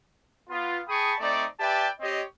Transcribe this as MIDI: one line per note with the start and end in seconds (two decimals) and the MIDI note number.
0.50 0.80 59
0.50 0.80 65
0.88 1.13 68
0.88 1.13 79
0.88 1.13 81
0.88 1.13 83
0.88 1.13 85
0.88 1.13 87
1.19 1.45 57
1.19 1.45 60
1.19 1.45 63
1.19 1.45 74
1.60 1.88 67
1.60 1.88 71
1.60 1.88 74
1.60 1.88 76
1.60 1.88 79
1.60 1.88 81
2.00 2.23 60
2.00 2.23 67
2.00 2.23 73
2.00 2.23 75